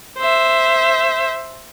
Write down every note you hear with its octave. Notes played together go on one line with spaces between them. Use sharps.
C5 E5